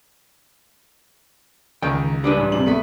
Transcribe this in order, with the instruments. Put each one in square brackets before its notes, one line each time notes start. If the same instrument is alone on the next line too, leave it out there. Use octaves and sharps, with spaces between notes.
[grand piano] C#2 [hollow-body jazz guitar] D#3 G5
[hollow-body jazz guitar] G3 D4 B4
[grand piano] A1
D1 C3 F#7
A3 B3 B6